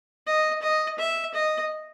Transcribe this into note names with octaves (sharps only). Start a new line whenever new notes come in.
D#5
D#5
E5
D#5